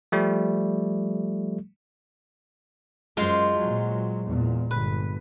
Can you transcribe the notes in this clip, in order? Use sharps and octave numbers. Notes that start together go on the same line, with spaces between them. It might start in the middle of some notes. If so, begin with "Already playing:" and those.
F3 G3 A3
F#2 G#3 F4 C5
A#2 F#3
E2 A#2
G1 B4